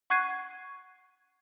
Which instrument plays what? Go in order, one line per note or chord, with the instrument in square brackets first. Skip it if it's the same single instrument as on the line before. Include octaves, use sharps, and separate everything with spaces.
[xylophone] F#5 C#6 F#6 G#6 C7 D#7